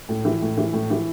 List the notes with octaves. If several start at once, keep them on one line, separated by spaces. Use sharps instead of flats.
A2
E3
A2
E3
A2
E3